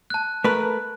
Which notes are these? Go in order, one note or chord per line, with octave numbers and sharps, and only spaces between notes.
A5 F#6
A3 A#4 B4